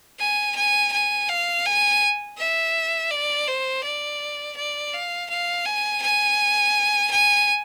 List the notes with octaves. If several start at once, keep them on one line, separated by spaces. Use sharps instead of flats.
G#5
G#5
G#5
F5
G#5
E5
D5
C5
D5
D5
F5
F5
G#5
G#5
G#5